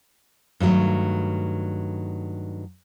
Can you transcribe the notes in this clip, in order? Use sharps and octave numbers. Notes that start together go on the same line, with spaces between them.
G2 D#3 F#3 A3